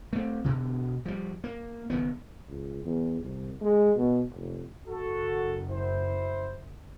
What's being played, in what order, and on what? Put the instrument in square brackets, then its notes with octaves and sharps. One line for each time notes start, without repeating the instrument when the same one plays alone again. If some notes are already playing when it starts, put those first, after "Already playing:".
[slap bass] A3 C4
B2 D3
F3 G3
A#3
F#1 D#3 B3
[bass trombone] C#2
E2
C2
G#3
B2
F1
[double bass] F#1 F#2 [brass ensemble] F#4 A4
[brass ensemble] E4 C5